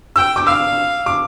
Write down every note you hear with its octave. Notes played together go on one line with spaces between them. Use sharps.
G5 E6
D6
F5 E6
D6